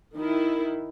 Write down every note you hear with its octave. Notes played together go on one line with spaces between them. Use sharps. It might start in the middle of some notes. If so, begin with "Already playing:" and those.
D#3 E4